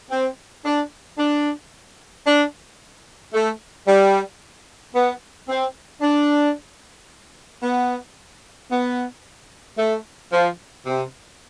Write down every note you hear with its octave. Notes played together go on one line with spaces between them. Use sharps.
C4
D4
D4
D4
A3
G3
B3
C4
D4
B3
B3
A3
F3
C3